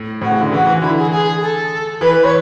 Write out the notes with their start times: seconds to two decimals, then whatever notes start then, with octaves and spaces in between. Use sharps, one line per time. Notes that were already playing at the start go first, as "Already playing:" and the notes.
Already playing: A2
0.21 A2 F#4
0.31 C#3
0.41 D3
0.52 E3 F#4
0.66 E3
0.81 D3 E4
0.97 G#4
1.11 G#4
1.41 A4
2.01 E3 B4
2.24 C#5